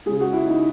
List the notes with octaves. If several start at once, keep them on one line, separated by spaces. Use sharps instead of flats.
C#3 G#3 G#4
F#4
E4
D#4